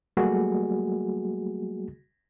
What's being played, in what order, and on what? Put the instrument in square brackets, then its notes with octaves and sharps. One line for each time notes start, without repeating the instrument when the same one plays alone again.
[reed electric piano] F#3 G3 A3 A#3 F#4 G#4